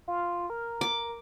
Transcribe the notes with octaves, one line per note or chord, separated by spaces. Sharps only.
F4
A#4
D6